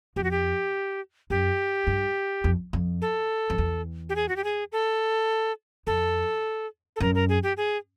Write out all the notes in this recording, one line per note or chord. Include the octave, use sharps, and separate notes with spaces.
F2 G4
F#4
G4
F#2 G4
G2
F2
F2
A4
F2
E2
G4
G#4
F#4
G4
G#4
A4
F2 A4
A4
F#2 A#4
A#4
G#4
G4
G#4